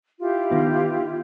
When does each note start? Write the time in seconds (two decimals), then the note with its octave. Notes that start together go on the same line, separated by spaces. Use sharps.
0.19 E4 F4 G4
0.50 D#3 B3 D#4